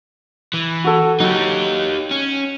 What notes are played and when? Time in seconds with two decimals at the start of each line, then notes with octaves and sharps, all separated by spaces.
0.53 E3
0.84 F#4 A4
1.20 F#3 D#4 G4
2.11 C#4